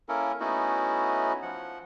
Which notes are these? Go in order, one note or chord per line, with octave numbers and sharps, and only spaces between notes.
A#3 C#4 E4 A4 A#4
A3 B3 C#4 D#4 E4 F#4
F3 F#5